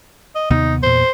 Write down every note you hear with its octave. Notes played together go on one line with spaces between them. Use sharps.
D#5
D#2 C3 B3 D#4
E2 A#2 C5